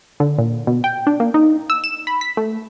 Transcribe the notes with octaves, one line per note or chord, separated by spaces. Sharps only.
D3
A#2
B2
G5
D4
A#3
D#4
E6
E7
B5
B6
A3